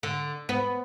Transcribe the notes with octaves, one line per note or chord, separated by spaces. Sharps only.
D3
B3